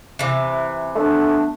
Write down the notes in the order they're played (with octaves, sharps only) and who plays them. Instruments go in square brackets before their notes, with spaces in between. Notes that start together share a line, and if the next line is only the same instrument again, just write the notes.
[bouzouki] C3 E3
[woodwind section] A3 B3 D4